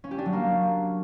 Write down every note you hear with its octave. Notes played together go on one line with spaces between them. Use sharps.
C#4
G4
D4
F#3
A#3